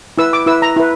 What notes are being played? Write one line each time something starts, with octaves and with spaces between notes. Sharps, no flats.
E4 B4 E6
D6
E4 B4 E6
A#5
E4 B4